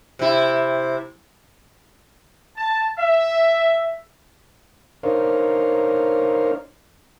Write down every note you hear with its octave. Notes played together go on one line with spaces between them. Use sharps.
C3 E4
A5
E5
D4 D#4 A#4 C5 C#5 F5